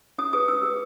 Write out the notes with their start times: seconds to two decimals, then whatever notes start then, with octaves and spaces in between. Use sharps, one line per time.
0.18 C#4 D#6
0.33 G#4 B4 D#6
0.48 C#4 E6
0.63 G#4 B4